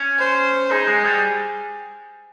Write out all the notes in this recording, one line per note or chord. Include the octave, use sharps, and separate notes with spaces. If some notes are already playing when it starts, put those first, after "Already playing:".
Already playing: C#4
C5
D#4 G#4
G#3
G3